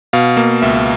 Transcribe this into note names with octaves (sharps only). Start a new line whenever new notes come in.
B2 F5
A#3
C#2 E5